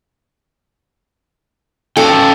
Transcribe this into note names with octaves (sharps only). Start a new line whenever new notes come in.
C#4 A4 F5 G5